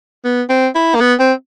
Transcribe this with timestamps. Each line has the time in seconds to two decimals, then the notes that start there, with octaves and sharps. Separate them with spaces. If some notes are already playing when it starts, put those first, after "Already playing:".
0.24 B3
0.49 C4
0.75 E4
0.94 A#3
1.00 B3
1.19 C4